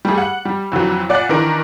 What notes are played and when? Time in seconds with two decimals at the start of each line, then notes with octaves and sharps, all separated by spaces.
0.05 G3 A3 G#4
0.18 F#5
0.45 G3
0.72 F2 D3 E3 F#3
1.09 A#2 D5 F#5 F#6
1.29 D#3 E3 D4 A#4